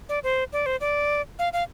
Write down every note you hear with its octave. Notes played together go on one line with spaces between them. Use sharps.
D5
C5
D5
C5
D5
F5
F5